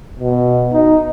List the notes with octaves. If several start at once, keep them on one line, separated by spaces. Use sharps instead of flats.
B2
D#4